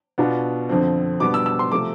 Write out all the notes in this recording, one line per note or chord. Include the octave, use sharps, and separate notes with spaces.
B2 B3 D4 F4
F2 D3 F3 C4
B2 G3 B3 D4 D6
E6
E6
C6
C3 F3 A3 D6